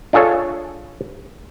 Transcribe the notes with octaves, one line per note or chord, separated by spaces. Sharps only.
D4 F4 G#4 A4 C#5